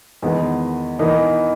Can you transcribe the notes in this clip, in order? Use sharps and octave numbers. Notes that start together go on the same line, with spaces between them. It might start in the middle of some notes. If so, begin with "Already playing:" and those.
E2 D#3 G#3 B3
E3 B3 D#4 A#4